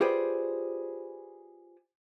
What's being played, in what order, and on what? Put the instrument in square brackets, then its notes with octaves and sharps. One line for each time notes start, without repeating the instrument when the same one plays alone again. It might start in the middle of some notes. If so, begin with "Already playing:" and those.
[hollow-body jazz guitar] F4 G4 G#4 B4 C5 D5